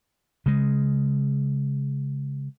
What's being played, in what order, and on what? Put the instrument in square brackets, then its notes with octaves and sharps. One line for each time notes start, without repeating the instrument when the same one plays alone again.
[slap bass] C#3 G#3